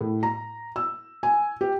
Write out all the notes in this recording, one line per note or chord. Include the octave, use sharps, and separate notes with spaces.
A2
A#5
E6
G#5
G4